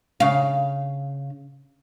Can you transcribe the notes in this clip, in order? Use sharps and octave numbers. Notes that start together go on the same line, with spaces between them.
C#3 F5